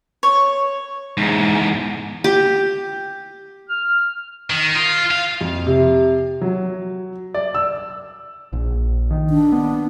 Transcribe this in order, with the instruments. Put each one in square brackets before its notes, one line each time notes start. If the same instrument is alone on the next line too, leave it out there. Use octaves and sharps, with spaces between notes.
[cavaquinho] C#5
[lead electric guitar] E2 G#2
[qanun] G4
[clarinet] F6
[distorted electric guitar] D#3
F4
F5
[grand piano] F2
C3
F#3
D5
E6
[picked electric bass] A#1
D#3
[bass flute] D4
[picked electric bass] B3